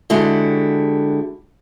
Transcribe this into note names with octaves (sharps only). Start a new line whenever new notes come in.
D3 G#3 E4 F#4 G4